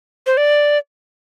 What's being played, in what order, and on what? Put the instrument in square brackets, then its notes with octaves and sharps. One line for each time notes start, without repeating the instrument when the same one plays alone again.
[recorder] C5
D5